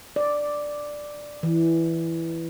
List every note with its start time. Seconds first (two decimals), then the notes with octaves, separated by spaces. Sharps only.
0.16 D5
1.43 E3